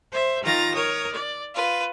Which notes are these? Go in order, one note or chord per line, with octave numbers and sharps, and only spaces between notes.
C5 E5
D#3 F4 A#5 A6 A#6
A#4 C#5 D#6
D5
F4 B4